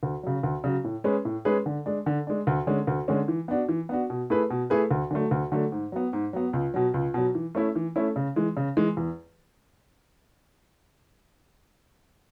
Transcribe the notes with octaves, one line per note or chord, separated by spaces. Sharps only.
D2
C#3 F#3
D2
C#3 F#3
A2
G#3 C#4 G#4 B4
A2
G#3 C#4 G#4 B4
D3
G#3 D4
D3
G#3 D4
D2
D3 G#3 C#4
D2
D3 G#3 C#4
E3
B3 D4 F#4
E3
B3 D4 F#4
B2
A3 E4 G#4 B4
B2
A3 E4 G#4 B4
D2
D3 F#3 A3
D2
D3 F#3 A3
G#2
F#3 B3
G#2
F#3 B3
C#2
B2 F#3
C#2
B2 F#3
E3
A3 C#4 E4
E3
A3 C#4 E4
C#3
E3 G#3
C#3
E3 G#3
E2